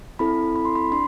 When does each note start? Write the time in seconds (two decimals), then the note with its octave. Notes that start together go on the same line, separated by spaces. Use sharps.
0.19 C4 E4 A4 B5
0.56 B5
0.65 C6
0.76 B5
0.92 D4 C6